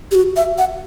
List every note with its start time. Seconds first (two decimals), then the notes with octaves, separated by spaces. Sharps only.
0.11 G4
0.15 F#4
0.36 E5
0.58 F#5